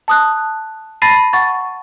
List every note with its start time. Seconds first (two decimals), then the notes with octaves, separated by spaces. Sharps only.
0.08 A5 D#6 F#6
1.02 A5 B5 A6 A#6 C7 D#7
1.33 F#5 C#6 A6